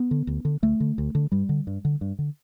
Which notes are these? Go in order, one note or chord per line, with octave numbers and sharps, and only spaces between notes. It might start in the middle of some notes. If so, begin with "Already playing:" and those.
Already playing: B3
D3
D2
D3
D2 A3
D3
D2
D3
G2 G3
D3
G2
D3
G2
D3